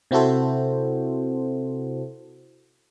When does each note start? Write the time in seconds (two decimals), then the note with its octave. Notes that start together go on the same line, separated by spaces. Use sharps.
0.11 C3 C4 E4 F#4 A4 C5